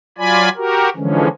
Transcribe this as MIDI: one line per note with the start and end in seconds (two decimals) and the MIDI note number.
0.18 0.49 54
0.18 0.49 65
0.18 0.49 74
0.18 0.49 80
0.18 0.49 83
0.57 0.89 66
0.57 0.89 67
0.57 0.89 70
0.96 1.28 50
0.96 1.28 52
0.96 1.28 53
0.96 1.28 56
0.96 1.28 61